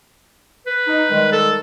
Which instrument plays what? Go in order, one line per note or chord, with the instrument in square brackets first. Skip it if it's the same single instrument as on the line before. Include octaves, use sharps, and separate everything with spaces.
[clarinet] B4
[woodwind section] D#4
D#3 G3 G#3
[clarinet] A4